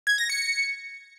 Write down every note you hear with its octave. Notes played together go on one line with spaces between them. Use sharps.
G#6
A#6
C#7